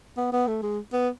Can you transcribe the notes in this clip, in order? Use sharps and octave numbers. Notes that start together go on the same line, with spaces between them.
B3
B3
A3
G#3
B3